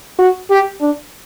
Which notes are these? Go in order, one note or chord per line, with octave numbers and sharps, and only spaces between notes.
F#4
G4
D4